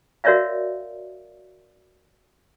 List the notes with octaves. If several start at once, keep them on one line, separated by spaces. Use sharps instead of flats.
F#4 A#4 C#5 D5 E5 F5